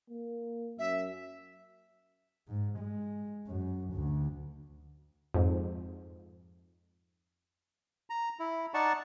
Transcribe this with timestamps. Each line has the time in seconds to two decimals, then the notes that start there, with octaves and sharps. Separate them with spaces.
0.10 A#3
0.79 F#2 E5
2.48 G#2
2.79 G#3
3.47 F#2
3.94 D2
5.34 F2 G#2
8.10 A#5
8.39 E4
8.74 D#4 D5 F#5 A5 C#6